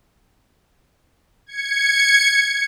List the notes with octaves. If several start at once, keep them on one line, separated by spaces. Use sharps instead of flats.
G#6 C#7